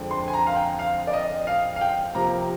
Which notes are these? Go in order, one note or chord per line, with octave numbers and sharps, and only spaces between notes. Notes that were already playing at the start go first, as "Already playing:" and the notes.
Already playing: F2 D3 G#3 C4
C6
G#5
A#5
F5
G5
F5
D5
D#5
F5
F5
G5
C3 F3 A#3 A#5